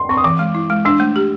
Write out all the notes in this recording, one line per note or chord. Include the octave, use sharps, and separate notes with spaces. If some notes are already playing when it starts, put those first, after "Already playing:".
Already playing: C6
C4 C#6
D#6
E3 D6
G#3
E4
G#3
D4 E6
A3
G4